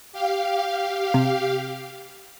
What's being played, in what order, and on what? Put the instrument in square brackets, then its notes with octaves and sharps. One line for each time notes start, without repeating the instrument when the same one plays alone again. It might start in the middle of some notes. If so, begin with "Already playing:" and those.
[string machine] G4 F5
[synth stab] C3